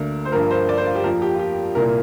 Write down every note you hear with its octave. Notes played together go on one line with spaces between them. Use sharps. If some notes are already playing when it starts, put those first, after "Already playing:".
Already playing: D2 D3 A#3 A#4
C5
G2 F3 A#3 A#4
C5
D5
C5
F4
G4
F2 F3 A#3 A#4
G4
F4
G4
C2 A#2 A#3 A#4